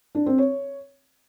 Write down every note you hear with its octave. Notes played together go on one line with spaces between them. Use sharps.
D4
C4
C#5